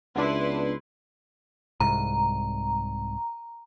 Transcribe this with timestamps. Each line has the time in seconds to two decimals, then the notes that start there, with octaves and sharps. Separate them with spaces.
0.16 C#2 B3 D4 E4 B4 C6
1.80 C2 G#2 A#5